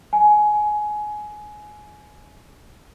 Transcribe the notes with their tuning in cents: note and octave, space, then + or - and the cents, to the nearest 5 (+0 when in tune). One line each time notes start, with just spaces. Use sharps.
G#5 +20